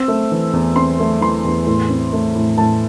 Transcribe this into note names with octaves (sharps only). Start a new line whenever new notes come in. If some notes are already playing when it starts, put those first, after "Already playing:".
Already playing: C4 E6
A3
E3
E2
C4 C6
A3
E3 C6
E2
A2
C4
A3
A2
A2 A5